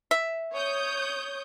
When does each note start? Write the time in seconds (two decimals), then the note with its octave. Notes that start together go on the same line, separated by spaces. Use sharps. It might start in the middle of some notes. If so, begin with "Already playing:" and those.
0.11 E5
0.54 C#5 D#6 G6